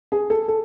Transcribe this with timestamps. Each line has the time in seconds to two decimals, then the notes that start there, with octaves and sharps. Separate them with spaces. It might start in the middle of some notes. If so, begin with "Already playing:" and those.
0.12 G#4
0.30 A4
0.48 A4